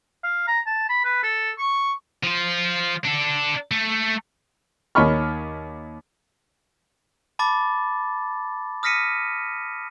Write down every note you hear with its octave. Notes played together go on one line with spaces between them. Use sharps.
F5
A#5
A5
B5
B4
A4
C#6
F3 F4
D4 A4
A3
D#2 C#5 D#5 B5 C#6 F6
A5 B5 D6 A6
D#6 F6 A#6 B6 C#7 D#7